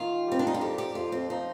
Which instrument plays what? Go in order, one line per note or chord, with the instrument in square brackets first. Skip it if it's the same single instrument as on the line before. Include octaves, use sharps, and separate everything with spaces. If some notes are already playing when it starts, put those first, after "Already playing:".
Already playing: [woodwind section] D#3 [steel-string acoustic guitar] F4
[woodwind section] G3 [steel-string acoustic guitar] C4
[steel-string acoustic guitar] D4
D#4
F4
[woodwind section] F2 [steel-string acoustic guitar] G4
[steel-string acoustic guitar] G4
[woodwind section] F2 [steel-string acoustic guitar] F4
[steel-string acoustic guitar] C4
[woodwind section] F3 [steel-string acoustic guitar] D#4